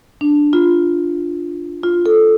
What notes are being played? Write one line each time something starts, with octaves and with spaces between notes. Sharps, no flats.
D4
F4
F4
A4